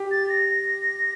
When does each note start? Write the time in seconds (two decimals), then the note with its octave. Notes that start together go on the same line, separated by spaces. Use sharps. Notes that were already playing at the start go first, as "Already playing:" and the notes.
Already playing: G4
0.11 A6
0.30 A#6
0.49 A#6